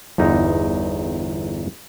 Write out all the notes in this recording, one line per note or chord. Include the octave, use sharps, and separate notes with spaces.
G1 E2 D#4